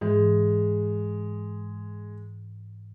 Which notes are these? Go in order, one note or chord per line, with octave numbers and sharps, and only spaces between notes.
G#2 E3 G#3